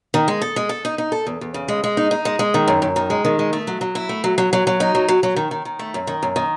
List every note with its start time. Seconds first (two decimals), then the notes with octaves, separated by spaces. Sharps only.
0.14 D#3
0.28 G#3
0.42 A4
0.56 G#3
0.69 A4
0.85 D#4
0.98 D#4
1.12 A4
1.27 E2
1.41 E2
1.54 C#3
1.68 G#3
1.84 G#3
1.97 D#4
2.11 D#4
2.25 G#3
2.39 G#3
2.54 D#3
2.68 F#2
2.82 F#2
2.96 D#3
3.10 G#3
3.25 D#3
3.39 G#3
3.53 A3
3.67 F#3
3.81 F#3
3.95 E4
4.09 A3
4.24 F#3
4.38 F#3
4.53 F#3
4.67 F#3
4.80 D#4
4.95 F#3
5.08 F#3
5.23 F#3
5.36 D#3
5.51 D#3
5.65 D#3
5.79 A3
5.94 F#2
6.07 D#3
6.23 F#2
6.36 D#3